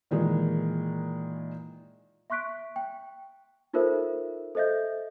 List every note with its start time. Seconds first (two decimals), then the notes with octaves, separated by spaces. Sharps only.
0.11 A#2 D#3 E3 G#3
2.30 E5 C6 C#6 F#6 B6 D7
2.76 G5
3.73 D#4 F4 A4 A#4 C5 E5
4.55 A4 C5 D#5 E5 G6